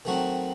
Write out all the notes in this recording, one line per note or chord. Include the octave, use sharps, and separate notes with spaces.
D#3 F#3 A3 C4 F#4